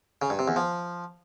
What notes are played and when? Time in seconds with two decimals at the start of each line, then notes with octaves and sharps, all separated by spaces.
0.22 C#3
0.30 G2
0.39 C3
0.48 E2
0.56 F3